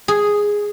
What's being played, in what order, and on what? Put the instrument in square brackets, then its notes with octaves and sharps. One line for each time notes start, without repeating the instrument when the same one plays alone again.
[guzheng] G#4